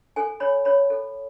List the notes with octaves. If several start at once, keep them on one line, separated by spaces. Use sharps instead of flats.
A4 G#5
C#5 B5
C#5 B5
A4